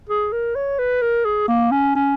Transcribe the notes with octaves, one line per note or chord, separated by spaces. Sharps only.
G#4
A#4
C#5
B4
A#4
G#4
A#3
C#4
C#4